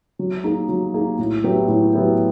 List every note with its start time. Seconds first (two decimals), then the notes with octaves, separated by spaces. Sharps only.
0.19 F#3
0.44 A#3 D#4 G#4
0.69 F#3
0.94 A#3 D#4 G#4
1.18 A2
1.44 F#3 B3 E4 G4
1.68 A2
1.93 F#3 B3 E4 G4